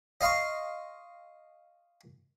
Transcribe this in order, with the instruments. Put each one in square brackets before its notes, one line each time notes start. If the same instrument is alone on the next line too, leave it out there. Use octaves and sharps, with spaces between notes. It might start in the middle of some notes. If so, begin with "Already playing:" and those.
[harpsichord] D#5 F5 C6 C#6